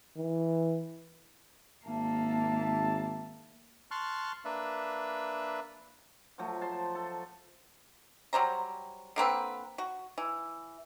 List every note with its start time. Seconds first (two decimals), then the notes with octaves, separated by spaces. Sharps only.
0.16 E3
1.86 G#1 A#3 E5 A5
3.91 A5 C6 C#6 F6 F#6
4.45 A#3 D4 B4 E5
6.38 F3 F#3 A3
6.61 C5 A5 C6
6.95 A4
8.33 F#3 G3 C5 A#5
9.16 D3 A#3 C4 B4
9.78 F#4
10.18 E3